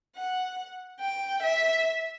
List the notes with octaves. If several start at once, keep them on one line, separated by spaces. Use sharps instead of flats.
F#5
G5
E5